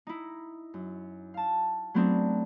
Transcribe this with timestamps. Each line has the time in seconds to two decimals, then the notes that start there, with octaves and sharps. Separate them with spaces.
0.07 D#4 E4
0.74 F#2
1.34 F5 A5
1.94 F#3 A3 B3 C4 D4 D#4